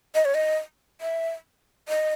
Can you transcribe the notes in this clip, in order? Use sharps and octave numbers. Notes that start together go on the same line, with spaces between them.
D#5
C#5
D#5
E5
D#5